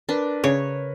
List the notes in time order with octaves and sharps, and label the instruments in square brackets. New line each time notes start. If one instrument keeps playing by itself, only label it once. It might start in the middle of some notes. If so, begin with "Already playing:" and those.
[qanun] D4 [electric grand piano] A#4 B4
[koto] C#3 [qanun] C#5